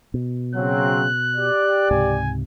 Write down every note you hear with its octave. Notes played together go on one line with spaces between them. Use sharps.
B2
C#3 F#3 C4 F#6
G4 D5
C#2 G#2 C3 G#5